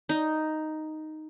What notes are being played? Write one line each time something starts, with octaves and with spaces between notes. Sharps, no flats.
D#4